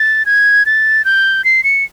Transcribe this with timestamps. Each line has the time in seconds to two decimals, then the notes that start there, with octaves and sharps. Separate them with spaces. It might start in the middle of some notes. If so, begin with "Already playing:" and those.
Already playing: A6
0.26 G#6
0.66 A6
1.05 G6
1.44 C7
1.64 C#7